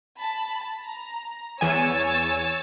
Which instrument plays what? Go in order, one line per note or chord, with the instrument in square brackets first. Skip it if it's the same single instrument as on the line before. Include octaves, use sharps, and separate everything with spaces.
[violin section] A5 B5
A#5
[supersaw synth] E2 G#5 [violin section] C#5 E6 A6